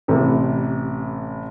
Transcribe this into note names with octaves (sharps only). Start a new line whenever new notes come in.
A1 C3 B3